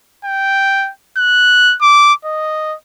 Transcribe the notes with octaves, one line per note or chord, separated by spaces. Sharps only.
G5
F#6
D6
D#5